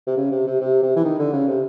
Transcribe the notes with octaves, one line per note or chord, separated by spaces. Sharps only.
C3
C#3
C3
C3
C3
C3
E3
D#3
D3
C#3
C3